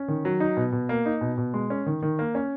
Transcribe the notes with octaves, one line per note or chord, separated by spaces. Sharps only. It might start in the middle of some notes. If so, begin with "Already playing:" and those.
Already playing: C#4
D#3
F#3
D#4
B2
B2
A#3
D#4
B2
B2
G#3
C#4
D#3
D#3
A#3
C#4